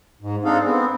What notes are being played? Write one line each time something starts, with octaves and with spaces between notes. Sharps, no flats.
G#2
C4 D4 D#4 G#4 A4 F5
B3 C4